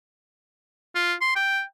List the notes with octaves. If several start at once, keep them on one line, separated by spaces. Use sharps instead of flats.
F4
C6
G5